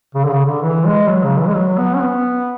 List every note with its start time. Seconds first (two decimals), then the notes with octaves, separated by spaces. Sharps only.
0.15 C#3
0.25 D3
0.31 C#3
0.45 D3
0.62 E3
0.85 G#3
1.08 F#3
1.24 C#3
1.39 E3
1.47 G#3
1.55 F#3
1.78 B3
1.95 C#4
2.01 B3